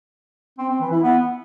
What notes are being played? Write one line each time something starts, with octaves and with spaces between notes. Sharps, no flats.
C4
C4
E3
E4
B3